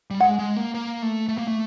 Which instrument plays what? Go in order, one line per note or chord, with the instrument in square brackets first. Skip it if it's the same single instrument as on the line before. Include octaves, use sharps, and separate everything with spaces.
[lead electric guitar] G3
[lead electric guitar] G#3 [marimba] F#5
[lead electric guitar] G#3
A#3
A#3
A3
A3
A#3
A3